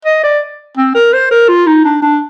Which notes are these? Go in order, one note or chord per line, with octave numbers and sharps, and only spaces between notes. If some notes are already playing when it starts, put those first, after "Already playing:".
D#5
D5
C4
A#4
C5
A#4
F4
D#4
D4
D4